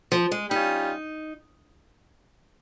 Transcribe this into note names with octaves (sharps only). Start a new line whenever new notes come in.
F3
G#3
G3 C#4 D#4 F4